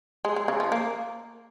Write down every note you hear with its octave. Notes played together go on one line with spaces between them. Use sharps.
G#3
G#3
C#3
F3
A#3